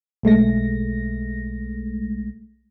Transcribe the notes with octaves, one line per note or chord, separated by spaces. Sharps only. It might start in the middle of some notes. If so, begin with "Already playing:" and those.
B1 G#3 A3 A#6